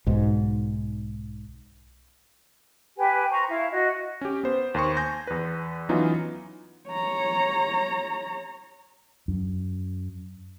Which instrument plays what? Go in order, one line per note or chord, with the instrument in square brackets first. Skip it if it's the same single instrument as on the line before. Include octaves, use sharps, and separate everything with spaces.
[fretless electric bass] B1 G#2
[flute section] G4 B4 G5 G#5
C5 A#5 C#6
E4 F5
F#4 D#5
[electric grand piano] C#4 G4
B3 C5
D#2 C5 C6 C#6
G#5 G6 A#6
E2 B4
E3 F#3 B3 C#4 D#4 F4
[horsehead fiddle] C#5 A#5
[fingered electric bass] F#2